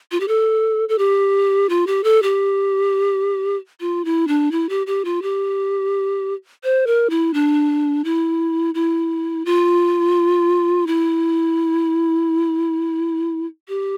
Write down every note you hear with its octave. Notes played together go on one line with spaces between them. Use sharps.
F4
G4
A4
A4
G4
F4
G4
A4
G4
F4
E4
D4
E4
G4
G4
F4
G4
C5
A#4
E4
D4
E4
E4
F4
E4
G4